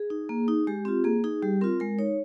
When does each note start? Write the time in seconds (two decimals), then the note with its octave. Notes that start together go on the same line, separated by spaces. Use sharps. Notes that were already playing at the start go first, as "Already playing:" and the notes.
Already playing: G#4
0.10 D#4
0.29 A#3
0.48 D#4
0.67 G#3 G4
0.85 C4 F4 G4
1.04 A#3 G#4
1.24 D#4 G#4
1.42 G3 G4
1.61 C4 F4 A#4
1.80 G#3 A#4
1.99 D#4 C#5